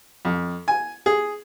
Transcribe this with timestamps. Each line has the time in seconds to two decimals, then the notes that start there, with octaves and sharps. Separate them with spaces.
0.25 F2
0.68 G#5
1.06 G#4